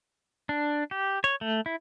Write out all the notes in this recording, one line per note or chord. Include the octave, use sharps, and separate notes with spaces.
D4
G4
C#5
A3
E4